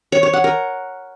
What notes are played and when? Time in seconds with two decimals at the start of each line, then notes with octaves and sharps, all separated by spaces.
0.12 C#5
0.23 C#5
0.33 F#5
0.44 A#4